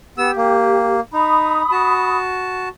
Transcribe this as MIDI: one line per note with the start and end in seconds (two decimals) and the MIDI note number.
0.18 0.31 59
0.18 0.98 67
0.18 0.31 88
0.36 1.00 58
1.13 1.62 63
1.13 2.20 83
1.13 2.20 87
1.72 2.69 66
1.72 2.69 81